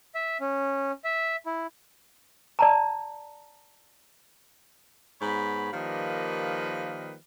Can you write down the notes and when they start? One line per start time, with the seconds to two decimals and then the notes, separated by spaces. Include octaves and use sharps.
0.15 E5
0.40 C#4
1.04 E5
1.46 E4
2.59 D5 A5 A#5
5.21 G#2 B3 C#5 B5
5.72 D#3 F3 G3 A#3 B4 D#5